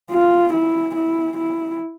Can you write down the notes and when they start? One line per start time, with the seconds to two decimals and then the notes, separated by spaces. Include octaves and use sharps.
0.11 F4
0.53 E4
0.95 E4
1.37 E4